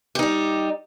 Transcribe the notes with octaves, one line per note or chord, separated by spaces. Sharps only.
G3 D#4 G4